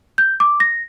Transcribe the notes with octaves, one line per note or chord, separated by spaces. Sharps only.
G6
D6
A#6